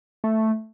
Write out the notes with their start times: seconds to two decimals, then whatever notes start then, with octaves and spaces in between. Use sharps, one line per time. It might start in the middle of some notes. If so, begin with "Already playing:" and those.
0.24 A3